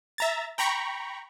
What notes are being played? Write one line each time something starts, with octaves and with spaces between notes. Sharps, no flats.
E5 A#5 A6
G5 A#5 B5 C#6